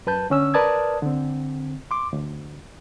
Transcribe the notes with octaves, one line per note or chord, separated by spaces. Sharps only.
F#2 B4 A5 G6
D3 C#4 E6
A#4 B4 D5 A5 D#6 G#6
D3 C4
C6 D6
D2